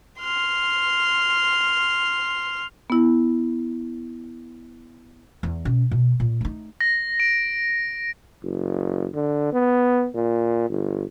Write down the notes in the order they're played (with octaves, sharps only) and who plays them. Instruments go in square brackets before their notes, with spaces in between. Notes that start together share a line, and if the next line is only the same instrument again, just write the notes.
[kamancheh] C6 F6
[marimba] B3 E4
[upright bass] E2
B2 C#4
B2
A#2
A3 D#4
[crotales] A#6
D7
[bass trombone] F#1
D3
B3
A#2
G1